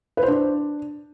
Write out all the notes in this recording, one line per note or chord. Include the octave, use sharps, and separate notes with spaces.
B4
C5
D4